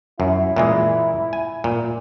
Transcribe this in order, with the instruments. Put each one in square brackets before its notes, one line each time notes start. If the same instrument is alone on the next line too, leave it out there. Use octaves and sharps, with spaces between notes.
[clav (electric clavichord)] F#2 [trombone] E4
[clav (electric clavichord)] A#2 E3 G#3
G#5
A#2